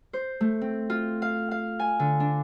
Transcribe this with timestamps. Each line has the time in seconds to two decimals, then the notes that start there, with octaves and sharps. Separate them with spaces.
0.13 C5
0.41 A3
0.61 C4
0.90 F4
1.22 F5
1.51 F5
1.79 G#5
1.99 D3
2.20 D4